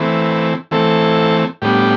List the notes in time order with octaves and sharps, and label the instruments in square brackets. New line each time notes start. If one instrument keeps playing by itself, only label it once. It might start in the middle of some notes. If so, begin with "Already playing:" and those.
Already playing: [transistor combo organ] E3 A3 C4 B4
E3 A3 C4 A4
A2 G3 B3 D4 G4